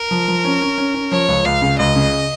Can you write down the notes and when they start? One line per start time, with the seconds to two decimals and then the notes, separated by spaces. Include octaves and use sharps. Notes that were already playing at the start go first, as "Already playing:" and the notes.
Already playing: A#4
0.11 F3
0.28 F3
0.44 C#4
0.62 C#4
0.78 C#4
0.94 C#4
1.11 F3 C#5
1.28 C#2
1.45 C#2 F5
1.62 C#3
1.78 C#2 D#5
1.96 C#3